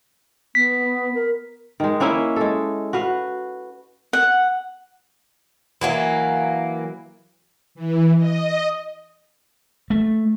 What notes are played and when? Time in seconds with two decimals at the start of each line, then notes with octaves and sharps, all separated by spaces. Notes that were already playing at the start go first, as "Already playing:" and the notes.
0.55 B3 B6
1.14 A#4
1.80 D#3 G#3
2.00 A#3 C#4 E4 E5
2.36 G#3 A4
2.93 F#4 B4 F5
4.13 F#5
5.81 E3 F#3 A#3
7.75 E3
8.18 D#5
9.90 A3